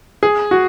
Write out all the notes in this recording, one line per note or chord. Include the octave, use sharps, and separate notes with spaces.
G#4
F#4